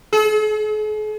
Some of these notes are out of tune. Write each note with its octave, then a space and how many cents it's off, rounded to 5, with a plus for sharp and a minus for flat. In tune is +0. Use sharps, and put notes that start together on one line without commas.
G#4 +45